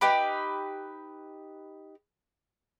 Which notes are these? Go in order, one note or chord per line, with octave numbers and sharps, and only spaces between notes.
D#4 G4 B4